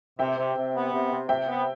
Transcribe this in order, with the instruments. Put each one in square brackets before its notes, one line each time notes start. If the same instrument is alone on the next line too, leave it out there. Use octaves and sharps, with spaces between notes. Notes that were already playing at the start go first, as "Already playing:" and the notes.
[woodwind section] C3 [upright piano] E5 G5
[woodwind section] C3
C3
B3
C3
C3
[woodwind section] C3 [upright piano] E5 G5
[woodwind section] B3